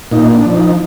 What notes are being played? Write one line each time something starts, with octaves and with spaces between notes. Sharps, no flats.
A#2 D#4
D4
F3
D#4